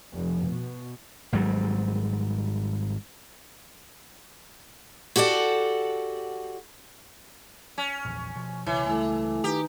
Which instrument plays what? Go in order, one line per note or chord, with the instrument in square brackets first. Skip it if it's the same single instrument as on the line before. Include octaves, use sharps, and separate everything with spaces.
[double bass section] F1
B2
[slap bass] G#1 G#2 F#3 G3
[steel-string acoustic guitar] F#4 G4 A4 D5 F#5
[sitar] C#4
[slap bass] A#1 E2
B2 F3
[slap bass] B1 C#3 [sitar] E3 [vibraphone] C#5
[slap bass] C#2 G3 [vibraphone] A3 E4 A4
[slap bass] D#3 [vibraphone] D#4 B4 A#5 [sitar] G4